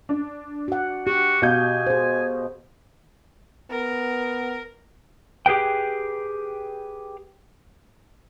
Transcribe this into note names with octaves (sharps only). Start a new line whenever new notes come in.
D4
F#4 F#5
F#4 G4
B2 F#4 F5 G#5 G6
G#4 C5
B3 A#4
G4 G#4 B4 G5